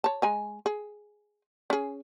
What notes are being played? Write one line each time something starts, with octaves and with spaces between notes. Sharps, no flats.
C#5 A5
G#3 G#5 A#5
G#4
C#4 G#4